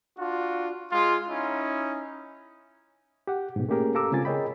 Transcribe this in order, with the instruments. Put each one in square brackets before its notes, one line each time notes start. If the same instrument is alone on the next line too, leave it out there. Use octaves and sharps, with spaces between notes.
[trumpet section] D4 F4 F#4
G#3 F4
C#4 D#4 E4
[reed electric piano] G4 F#5
G#2 B2
A3 A#3 C#4 G4 G#4 A#4
G4 A4 F5 A#5 D6 E6
C#3 G#3 C4 F4 G#5 A6
G#4 A#4 C#5 D#5 G5 B5